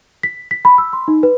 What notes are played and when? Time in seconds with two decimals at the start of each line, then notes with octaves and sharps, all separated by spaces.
0.23 B6
0.51 B6
0.65 B5
0.78 E6
0.93 C6
1.08 D#4
1.23 B4